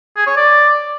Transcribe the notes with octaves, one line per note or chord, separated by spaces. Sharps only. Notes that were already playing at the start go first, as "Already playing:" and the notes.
G#4
C#5
D5